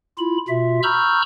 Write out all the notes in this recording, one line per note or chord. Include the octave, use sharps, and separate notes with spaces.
E4 F4 B5
B2 F4 E5
A#5 B5 C#6 E6 F6 G6